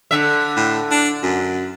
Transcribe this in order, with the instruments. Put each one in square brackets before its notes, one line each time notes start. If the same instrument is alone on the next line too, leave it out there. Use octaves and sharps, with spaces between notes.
[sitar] D3 E5
[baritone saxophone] A2
D4
F#2